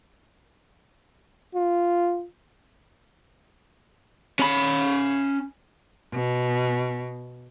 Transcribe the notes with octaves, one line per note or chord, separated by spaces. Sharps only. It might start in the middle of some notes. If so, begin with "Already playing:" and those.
F4
C#4 B5
B2